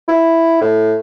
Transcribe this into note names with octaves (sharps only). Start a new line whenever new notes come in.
E4
A2